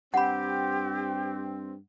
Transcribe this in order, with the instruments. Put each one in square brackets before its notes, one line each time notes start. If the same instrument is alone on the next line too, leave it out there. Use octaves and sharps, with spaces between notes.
[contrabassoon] G2 [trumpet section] C4 [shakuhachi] G4 [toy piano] F#5 B5